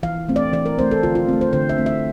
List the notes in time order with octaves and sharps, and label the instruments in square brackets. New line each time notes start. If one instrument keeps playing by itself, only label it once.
[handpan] E3 F5
A3 C4
D5
E3 D5
A#4
A3 C4 C5
A4
D3 F4
F4
A3 C4
C5
D3 C5
E5
A3 C4
E5